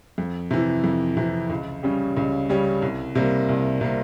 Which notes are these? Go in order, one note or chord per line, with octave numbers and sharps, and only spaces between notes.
F2
C3 E3
F2
C3 E3
C#2
C#3 G3 C#4 G4
C#2
C#3 G3 C#4 G4
C2
C3 G3 A#3
C2
C3 G3 A#3